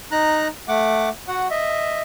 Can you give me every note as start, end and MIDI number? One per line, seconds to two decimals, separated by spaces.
0.12 0.48 63
0.12 0.48 82
0.12 0.48 90
0.68 1.09 57
0.68 1.09 78
0.68 1.09 86
1.28 1.47 66
1.28 1.47 78
1.50 2.01 75
1.50 2.01 76